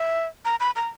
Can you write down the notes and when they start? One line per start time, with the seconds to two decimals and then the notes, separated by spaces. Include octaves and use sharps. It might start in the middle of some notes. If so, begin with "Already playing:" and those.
Already playing: E5
0.45 A#5
0.60 B5
0.76 A#5